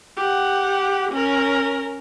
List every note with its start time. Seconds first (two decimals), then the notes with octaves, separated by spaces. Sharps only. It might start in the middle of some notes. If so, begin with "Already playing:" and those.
0.17 G4 F#5
1.12 C#4 A#4